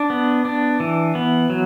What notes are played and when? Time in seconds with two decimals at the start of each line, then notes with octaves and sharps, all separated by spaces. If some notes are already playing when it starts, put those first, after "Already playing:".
Already playing: D4
0.10 B3
0.45 D4
0.80 E3
1.15 B3
1.50 F#3